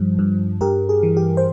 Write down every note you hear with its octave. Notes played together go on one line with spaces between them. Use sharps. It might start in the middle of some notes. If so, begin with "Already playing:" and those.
Already playing: G2 F3
G2
G2 G4 A#4
G#4
E3
G4
C5